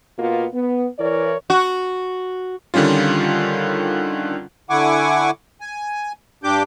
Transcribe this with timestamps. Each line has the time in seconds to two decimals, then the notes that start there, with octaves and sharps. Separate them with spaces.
0.18 B2 A#3 B3 F4
0.53 B3
0.99 E3 E4 A#4 C#5 D5
1.50 F#4
2.74 D3 D#3 G3 C#4 F4
4.70 D3 E4 F#5 G#5 C#6 D6
5.61 G#5
6.44 G2 D4 G4 D6 G6